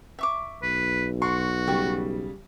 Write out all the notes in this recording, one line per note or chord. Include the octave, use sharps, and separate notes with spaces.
E5 C#6 D6
B1 B4
F#4 C6 C#6
C#3 G3 G5 C#6